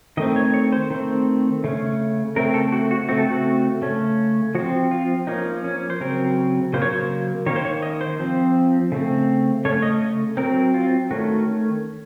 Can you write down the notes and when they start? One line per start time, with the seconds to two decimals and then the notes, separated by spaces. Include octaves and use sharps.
0.17 D#3 A3 C4 D#5
0.36 C#5
0.54 C#5
0.72 C5
0.90 D#3 A3 C4
1.64 C#3 A3 C#4
2.36 C#3 A3 C4 A#4
2.54 A4
2.72 F#4
2.91 F#4
3.09 C#3 A3 C4 F#4
3.18 A4
3.26 F#4
3.82 C#3 A3 C#4
4.55 F3 C4 F#4
4.91 F4
5.27 F3 A#3 C#4 D#4
5.64 C#4
5.90 C5
6.01 C#3 F#3 C4 A#4
6.73 C#3 F#3 A#3 C5
6.82 C#5
6.90 C5
7.46 D#3 A#3 C#4 C#5
7.56 C5
7.65 C#5
7.82 D#5
8.01 C5
8.19 F3 C4
8.92 C#3 A3 C4
9.65 C#3 A3 C#4 C#5
9.82 D#5
10.02 D#5
10.37 F#3 C4 A#4
10.74 F4
11.11 D#3 A3 C#4 F#4